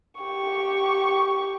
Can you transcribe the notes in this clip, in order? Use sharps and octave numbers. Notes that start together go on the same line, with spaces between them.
G4 C#6